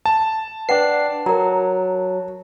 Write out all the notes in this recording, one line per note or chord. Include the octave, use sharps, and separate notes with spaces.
A5
D4 B4 F#5 G5 C7
F#3 A#4 A#5